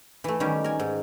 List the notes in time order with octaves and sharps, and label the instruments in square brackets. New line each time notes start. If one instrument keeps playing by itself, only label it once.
[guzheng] E3 A3
D#3 G3 C#4 G4
A#4 G#5
G#2